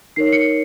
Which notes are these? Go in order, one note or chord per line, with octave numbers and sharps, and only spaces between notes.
D#4 A#4 C#5 C7
C#7